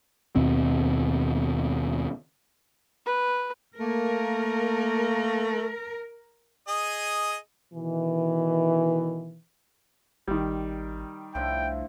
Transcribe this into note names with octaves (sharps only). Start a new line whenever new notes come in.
D#2 B2 C4
B4
A3 A#3 A#4
G#4 D#5 D#6
B2 D#3 E3
G#1 D#3 G3
C2 A2 D3 F3 G5